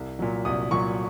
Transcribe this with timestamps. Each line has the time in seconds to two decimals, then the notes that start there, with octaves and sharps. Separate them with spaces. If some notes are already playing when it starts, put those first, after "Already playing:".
Already playing: C2
0.19 A#2 F#3
0.45 C2 D#6
0.71 A#2 F#3 C#6